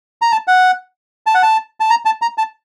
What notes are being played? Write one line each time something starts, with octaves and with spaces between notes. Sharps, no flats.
A#5
A5
F#5
A5
F#5
A5
A5
A#5
A5
A#5
A5